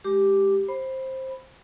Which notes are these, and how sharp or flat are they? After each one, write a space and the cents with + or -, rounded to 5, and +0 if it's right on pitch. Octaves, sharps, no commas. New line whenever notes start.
G#3 +0 G4 +0 D6 +0
C5 +10 B5 +0